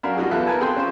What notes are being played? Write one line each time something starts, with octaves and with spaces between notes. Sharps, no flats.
F#2 D4 A#4 F5
G3 D4 D#4 F4 F#4 G#4
E2 B3 F4 A4 E5 F#6
A#4 B4 G#5 A5
C4 G#4 A4 G5 C6
C#4 F4 C5